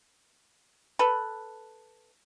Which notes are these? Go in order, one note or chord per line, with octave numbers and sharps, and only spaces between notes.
A4 B4